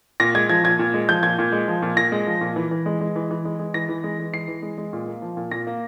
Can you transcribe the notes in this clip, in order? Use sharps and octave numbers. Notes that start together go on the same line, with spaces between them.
A#2 A#6
G#3 G#6
F3 G#6
A#2 G#6
A#2
G#3
F3 G6
A#2 G#6
A#2
G#3
F3
A#2
A#2 A#6
G#3
F3
A#2
E3
E3
G#3
G#3
E3
E3
G#3
G#3
E3 A#6
E3
G#3
G#3
E3 C7
E3
G#3
G#3
A#2
A#3
F3
A#2
A#2 A#6
A#3